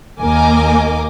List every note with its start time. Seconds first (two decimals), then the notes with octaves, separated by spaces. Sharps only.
0.21 D#2 A#3 A#4 D#5 G#5 D6